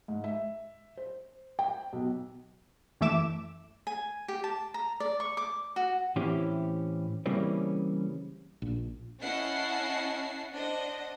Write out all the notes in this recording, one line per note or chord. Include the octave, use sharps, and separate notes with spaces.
G#2
E5
C5
G5
B1
F#2 E3 A3 E5 D6 E7
G#5
G4
A5
A#5
D5
C#6
D6
F#4
A2 E3 C4 C#4 E4 G4
C#3 E3 G3 A#3 C4 C#4
A#1
C#4 E4 D#5 F#5 A5 C7
D4 C5 D#5 F#5